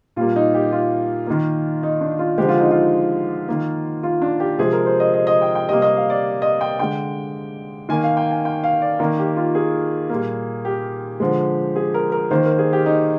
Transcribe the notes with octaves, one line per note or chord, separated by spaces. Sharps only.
A#2 G3 A#3 F4
D#4
G4
F4
D#3 A#3
D#4
D4
F4
D3 F3 G#3 G4
F4
D#4
F4
D#3 A#3
F4
D4
G4
C3 F3 G#3 G#4
A#4
C5
D#5
D#5
D#5
G5
G5
C3 G3 A#3 D#5
D#5
F5
D5
D#5
G5
D3 G#3 G5
D#3 A#3 G#5
F5
G5
G#5
G5
F5
D5
D#3 A#3 A#4
G4
F4
G#4
A#2 G3 A#3
G4
D3 F3 G#3
G#4
A#4
A#4
D#3 A#3 C5
A#4
G#4
G4
D#4